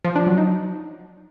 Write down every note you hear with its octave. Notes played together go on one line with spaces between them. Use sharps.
F3
D4
F#3
D#4